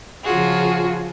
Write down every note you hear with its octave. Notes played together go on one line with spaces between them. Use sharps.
C#3 F3 F4 F#4 G#4